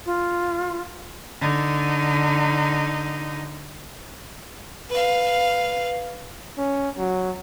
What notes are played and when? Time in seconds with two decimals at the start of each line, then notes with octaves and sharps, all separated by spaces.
0.06 F4
1.41 D3 D#4
4.90 B4 F5
6.58 C#4
6.98 F#3